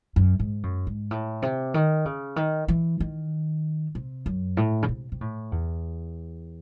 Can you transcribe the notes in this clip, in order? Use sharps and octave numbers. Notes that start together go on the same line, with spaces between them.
F#2
G#2
F#2
G#2
A2
C3
D#3
C#3
D#3
E3
D#3
C3
F#2
A2
C#3
C3
C3
A2
E2